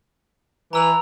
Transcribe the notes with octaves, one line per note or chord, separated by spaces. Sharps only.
E3 A#5 E6 F7